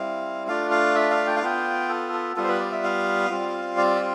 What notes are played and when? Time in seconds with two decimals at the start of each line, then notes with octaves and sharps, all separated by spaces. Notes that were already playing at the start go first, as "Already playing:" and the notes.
Already playing: G3 C4 E4 F5
0.48 A3 D4 F4 F5
0.71 F5
0.95 E5
1.10 F5
1.27 G5
1.36 F5
1.42 B3 F4 G5
1.89 A4
2.13 A4
2.36 G3 B3 F4 A4
2.44 C5
2.49 B4
2.60 D5
2.72 E5
2.83 F5
3.31 G3 C4 F4
3.77 D5
3.95 G4